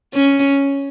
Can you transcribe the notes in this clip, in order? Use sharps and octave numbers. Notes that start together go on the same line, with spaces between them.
C#4